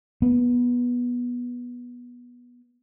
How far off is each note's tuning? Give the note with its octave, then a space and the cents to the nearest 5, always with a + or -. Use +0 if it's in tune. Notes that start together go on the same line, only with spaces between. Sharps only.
B3 -15